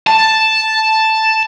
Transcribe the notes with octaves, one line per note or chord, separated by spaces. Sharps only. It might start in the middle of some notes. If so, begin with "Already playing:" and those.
A5